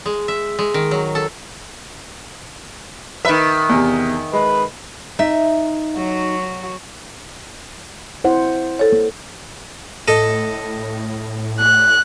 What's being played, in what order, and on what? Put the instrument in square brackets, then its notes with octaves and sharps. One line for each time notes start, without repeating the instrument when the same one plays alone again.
[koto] G#3
E5
G#3
D#3
F#3
A4
[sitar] D#3 E5 [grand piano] B4 B5
[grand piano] E2 C3
[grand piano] G#3 [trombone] B4
[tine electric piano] D#4 [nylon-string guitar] E5
[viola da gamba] F#3 F#4
[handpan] E4 C5 F#5
[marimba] A4 C#5
[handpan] A#3
[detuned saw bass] A2 [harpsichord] A4 D#5
[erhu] F#6